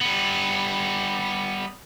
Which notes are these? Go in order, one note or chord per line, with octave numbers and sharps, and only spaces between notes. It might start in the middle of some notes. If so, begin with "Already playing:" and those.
G3 B3